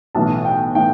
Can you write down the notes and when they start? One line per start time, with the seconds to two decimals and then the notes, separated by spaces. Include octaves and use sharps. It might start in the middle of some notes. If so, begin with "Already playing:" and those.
0.15 B1 A2 E3 A5
0.45 G5
0.75 A2 E3 G5